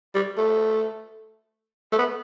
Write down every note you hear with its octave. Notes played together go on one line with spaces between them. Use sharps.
G3
A3
A3
B3